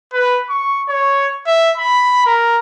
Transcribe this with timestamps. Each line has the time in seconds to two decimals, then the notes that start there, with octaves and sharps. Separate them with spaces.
0.13 B4
0.49 C#6
0.88 C#5
1.46 E5
1.77 B5
2.26 A#4